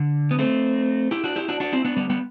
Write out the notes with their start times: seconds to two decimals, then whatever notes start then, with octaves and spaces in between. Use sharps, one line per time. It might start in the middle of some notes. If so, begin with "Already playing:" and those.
Already playing: D3
0.31 B3
0.39 A3 C4
1.11 E4 G4
1.24 D4 F#4
1.36 E4 G4
1.48 D4 F#4
1.60 D4 F#4
1.73 C4 E4
1.85 B3 D4
1.97 G3 B3
2.10 G3 B3